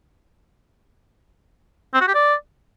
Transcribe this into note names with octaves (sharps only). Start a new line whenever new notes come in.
C4
F#4
G4
D5